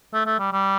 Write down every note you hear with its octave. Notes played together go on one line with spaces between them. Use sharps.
A3
A3
G3
G3